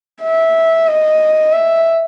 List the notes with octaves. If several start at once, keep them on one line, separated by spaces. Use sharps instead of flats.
E5
D#5
E5